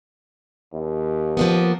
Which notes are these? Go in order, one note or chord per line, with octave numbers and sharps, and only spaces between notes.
D#2
F3 A#3 B3